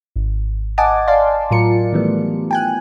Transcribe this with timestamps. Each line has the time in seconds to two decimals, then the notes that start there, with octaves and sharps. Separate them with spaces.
0.16 G#1
0.78 D#5 F#5 G#5 A5 D6
1.08 D5 F5 A5 C6
1.51 A2 F#3 F4 A#4 C#7
1.92 D#3 E3 G3 A3 B3
2.51 G5 G#5 F#6